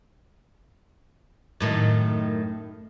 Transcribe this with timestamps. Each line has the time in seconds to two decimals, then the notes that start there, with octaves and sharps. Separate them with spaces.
1.60 F#2 A2 D#3